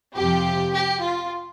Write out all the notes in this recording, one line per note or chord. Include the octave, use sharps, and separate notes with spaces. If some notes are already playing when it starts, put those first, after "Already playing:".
F2 C3 F3 G4
G4
F4